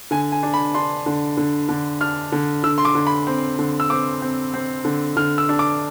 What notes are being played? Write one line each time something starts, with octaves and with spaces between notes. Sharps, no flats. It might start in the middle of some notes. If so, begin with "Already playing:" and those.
D3 G#5
G#5
D4
B5
D4 C6
D3
D3
D3
D4 F6
D3
D3 E6
C6
D6
D3
B5
C4
D3
E6
C4 D6
C4
C4
D3
D3 F6
E6
D4
D6